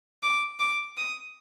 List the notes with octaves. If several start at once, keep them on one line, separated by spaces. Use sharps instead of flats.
D6
D6
D#6